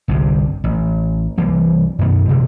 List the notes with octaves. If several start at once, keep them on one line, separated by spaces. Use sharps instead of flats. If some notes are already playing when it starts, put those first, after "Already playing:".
G1 C2 G2 C3
A1
C2 E3 G3 A#3
F#2 B2 D#3 A3
A1 B2 E3 A3